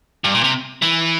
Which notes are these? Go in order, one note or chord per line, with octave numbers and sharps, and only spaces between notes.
G2
A#2
C3
E3